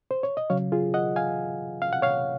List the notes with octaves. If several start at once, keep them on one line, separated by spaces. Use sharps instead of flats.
C5
C#5
D#5
C#3 F#3 C#5 F5
F4 G#4
D#5 F#5
F5 G#5
F5
F#5
C#5 F5